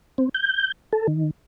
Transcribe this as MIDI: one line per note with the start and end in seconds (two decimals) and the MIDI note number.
0.18 0.29 60
0.34 0.72 91
0.93 1.07 69
1.07 1.31 51